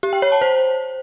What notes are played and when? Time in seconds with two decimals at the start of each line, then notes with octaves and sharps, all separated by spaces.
0.03 G4
0.13 G5
0.22 C#5
0.32 A5
0.42 C5